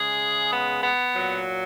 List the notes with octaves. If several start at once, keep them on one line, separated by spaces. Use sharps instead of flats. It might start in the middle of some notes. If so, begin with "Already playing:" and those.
Already playing: C#3 G#3 G#4
B3
B3
A#2 F#3